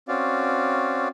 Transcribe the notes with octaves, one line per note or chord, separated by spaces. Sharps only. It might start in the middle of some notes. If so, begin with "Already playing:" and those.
C4 C#4 F#4 D5 F5